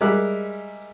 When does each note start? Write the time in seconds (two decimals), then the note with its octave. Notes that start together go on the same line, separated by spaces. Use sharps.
0.01 G3 G#3 A#4 E5 D6 F#6